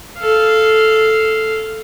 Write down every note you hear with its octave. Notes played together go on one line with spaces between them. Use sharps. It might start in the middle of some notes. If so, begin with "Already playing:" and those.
A4 F5